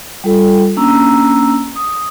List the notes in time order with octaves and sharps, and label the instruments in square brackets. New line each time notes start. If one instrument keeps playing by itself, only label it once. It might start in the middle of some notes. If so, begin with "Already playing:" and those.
[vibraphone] G3 F4 A4 G5
A#3 C#4 D4 A#5 E6
D#6